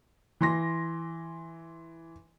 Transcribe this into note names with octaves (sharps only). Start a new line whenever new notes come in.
E3 C6 A#6